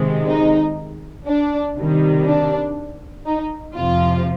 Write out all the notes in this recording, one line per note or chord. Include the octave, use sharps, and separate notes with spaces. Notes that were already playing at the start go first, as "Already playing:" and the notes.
Already playing: C3 D#3 G#3
D#4
D4
C3 D#3 G3
D4
D#4
F2 C3 F3 F4